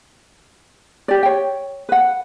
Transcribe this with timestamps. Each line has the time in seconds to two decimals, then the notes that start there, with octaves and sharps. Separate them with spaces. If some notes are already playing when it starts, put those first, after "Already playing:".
1.08 G4 D5
1.23 C#5 G5
1.89 B4 F#5